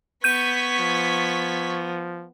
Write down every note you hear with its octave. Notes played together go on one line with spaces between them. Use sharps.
B3 C#6 G6 G#6 B6 D#7
F3